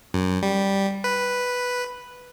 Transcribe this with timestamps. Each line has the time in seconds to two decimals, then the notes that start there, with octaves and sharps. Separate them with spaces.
0.14 F#2
0.43 G3
1.04 B4